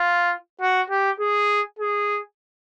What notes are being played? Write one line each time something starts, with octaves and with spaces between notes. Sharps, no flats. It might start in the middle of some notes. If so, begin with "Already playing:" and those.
Already playing: F4
F#4
G4
G#4
G#4